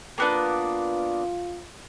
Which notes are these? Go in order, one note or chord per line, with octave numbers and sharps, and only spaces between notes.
A#3 B3 D4 F4